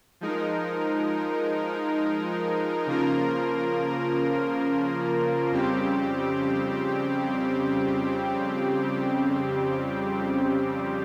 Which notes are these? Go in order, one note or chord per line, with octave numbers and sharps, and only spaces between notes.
F3 G#3 D#4 A#4
C#3 F3 A#3 F4 A#4
F2 C#3 G3 C4 G4